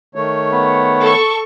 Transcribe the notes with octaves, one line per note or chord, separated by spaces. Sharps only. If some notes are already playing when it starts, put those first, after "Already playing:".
D#3 A3 C#5
B3
A4 C#6